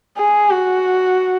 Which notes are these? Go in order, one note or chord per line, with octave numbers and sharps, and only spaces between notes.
G#4
F#4